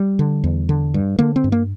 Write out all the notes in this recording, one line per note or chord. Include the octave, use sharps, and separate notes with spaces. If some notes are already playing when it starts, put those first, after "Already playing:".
Already playing: G3
D3
E2
D3
G2
D3 A#3
C4
G2
A#3